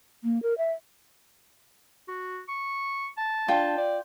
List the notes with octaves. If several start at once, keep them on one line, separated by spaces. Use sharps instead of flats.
A#3
A#4
E5
F#4
C#6
A5
D4 F4 G5
D5